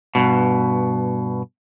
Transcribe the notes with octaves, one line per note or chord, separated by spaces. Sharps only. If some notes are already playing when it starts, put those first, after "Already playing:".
G2 B2